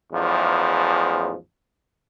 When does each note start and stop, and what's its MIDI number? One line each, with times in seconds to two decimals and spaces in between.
0.12 1.35 33
0.12 1.35 40
0.12 1.35 44
0.12 1.35 53